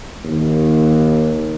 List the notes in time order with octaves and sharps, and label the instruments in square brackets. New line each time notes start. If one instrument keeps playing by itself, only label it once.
[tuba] D#2